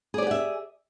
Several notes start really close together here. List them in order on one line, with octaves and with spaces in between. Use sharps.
G#4 D5 G4 F#5 E5